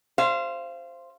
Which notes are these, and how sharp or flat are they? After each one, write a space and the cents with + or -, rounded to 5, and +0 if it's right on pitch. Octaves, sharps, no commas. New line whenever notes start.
C5 +5 F5 -30